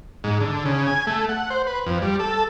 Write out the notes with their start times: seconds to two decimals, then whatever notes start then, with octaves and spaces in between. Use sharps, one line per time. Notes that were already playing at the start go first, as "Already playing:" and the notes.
0.24 G#2
0.40 D3
0.65 C#3
0.87 G#5
1.07 A3
1.29 F#5
1.50 C5
1.67 B4
1.86 F2
2.02 G3
2.19 A4